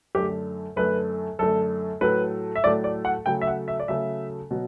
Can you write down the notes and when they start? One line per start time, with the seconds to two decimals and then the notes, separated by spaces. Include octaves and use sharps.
0.15 F#2 D3 A3 G4
0.76 F#2 D3 A3 B4
1.39 F#2 D3 A3 A4
2.01 A2 F#3 A3 B4
2.56 E5
2.64 A2 F#3 A3 D5
2.84 D5
3.05 F#5
3.26 C#3 F#3 A3 G5
3.41 E5
3.47 F#5
3.68 E5
3.80 D5
3.88 C#3 F#3 A3 E5
4.51 B2 F#3